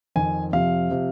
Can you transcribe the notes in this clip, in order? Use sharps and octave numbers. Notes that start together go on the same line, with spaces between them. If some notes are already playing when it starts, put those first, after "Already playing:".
F2 D#3 G#5
F2 C3 F3 F5
C3 F3